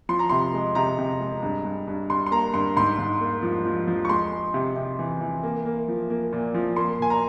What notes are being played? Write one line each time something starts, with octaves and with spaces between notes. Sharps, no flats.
F3 C6
A#5
C3 C6
G#3
C3 A#5
C3
G#3
G2
G2
G2
G2 C6
C6
A#3 A#5
G2 C6
G#2 C6
G#2
A#3
F3
F3
F3
C#6
G#3 C6
G#3
C3
C3
E3
E3
A#3
A#3
F3
A#3
A#2
F3
A#3 C6
A#2 G#5
A#5